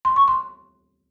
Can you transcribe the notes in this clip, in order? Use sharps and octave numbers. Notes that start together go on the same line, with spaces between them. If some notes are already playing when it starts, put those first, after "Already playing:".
C6
C#6
C6